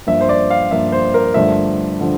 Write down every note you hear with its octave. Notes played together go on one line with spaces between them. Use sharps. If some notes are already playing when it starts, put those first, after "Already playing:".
G2 F3 A#3 E5
C5
D5
F5
G2 F3 A#3 E5
C5
A#4
G2 D3 F3 A3 E5
D3 F3